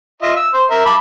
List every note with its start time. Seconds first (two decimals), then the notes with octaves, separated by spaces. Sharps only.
0.22 F4 D#5 E5
0.37 E6
0.54 C5
0.71 A#4 E5
0.86 A5 B5 D6